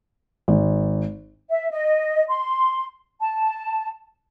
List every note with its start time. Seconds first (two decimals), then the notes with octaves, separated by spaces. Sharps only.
0.48 G#1
1.50 E5
1.71 D#5
2.28 C6
3.21 A5